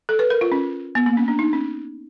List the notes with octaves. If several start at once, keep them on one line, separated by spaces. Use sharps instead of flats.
A4
B4
A#4
F4
C#4
B3
A#3
C#4
D4
D#4
C#4